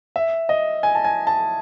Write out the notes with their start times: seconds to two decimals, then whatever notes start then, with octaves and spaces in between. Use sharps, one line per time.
0.16 E5
0.49 D#5
0.83 G#5
0.95 A5
1.04 G#5
1.27 A5